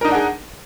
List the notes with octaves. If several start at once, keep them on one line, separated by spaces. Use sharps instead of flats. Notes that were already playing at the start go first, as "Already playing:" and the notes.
D4 D#4 G#4 A#4 F#5